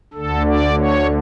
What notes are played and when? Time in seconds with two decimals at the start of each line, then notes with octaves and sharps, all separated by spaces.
0.14 D2 D3 A4
0.46 D5
0.78 C#5